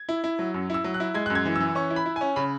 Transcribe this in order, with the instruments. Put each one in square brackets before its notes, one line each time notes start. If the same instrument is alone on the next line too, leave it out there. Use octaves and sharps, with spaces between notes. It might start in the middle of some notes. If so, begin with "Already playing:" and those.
Already playing: [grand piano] G#6
E4
E4
F#3
F#2
E4 E6
F#3
F#6
E4
G#3 G#6
F#2 F#6
G#6
E3
E3 E6
C#4 C#6
E4
B5
E4
C#4 G#5
C#3 B5